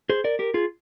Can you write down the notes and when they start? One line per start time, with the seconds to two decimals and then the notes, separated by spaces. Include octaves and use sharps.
0.10 G#4 C5
0.24 A#4 D5
0.39 G4 A#4
0.54 F4 G#4